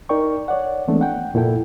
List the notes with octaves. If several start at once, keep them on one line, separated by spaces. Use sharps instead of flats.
D#4 A#4 D5 G5 C#6
C#5 D5 F#5
E3 G#3 A3 B3 C4 D4
F#5 G5
F2 A#2 E4 A4 G5